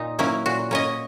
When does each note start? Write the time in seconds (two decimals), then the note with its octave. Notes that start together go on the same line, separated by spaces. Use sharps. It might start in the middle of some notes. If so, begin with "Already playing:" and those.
Already playing: A#2 D#4
0.19 F#3 A#3 C#4 E4
0.46 A#2 F#4
0.71 A#3 C#4 D#5